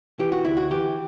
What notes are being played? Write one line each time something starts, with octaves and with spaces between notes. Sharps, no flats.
E3 G4
F#4
D2 E4
F#4
E3 G4